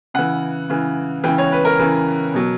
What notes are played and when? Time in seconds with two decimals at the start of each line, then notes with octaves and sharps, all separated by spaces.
0.14 C#3 E3 F#5
0.70 C#3 E3
1.24 C#3 E3 G5
1.38 C#5
1.52 B4
1.65 A#4
1.79 C#3 E3
2.34 B2 F#3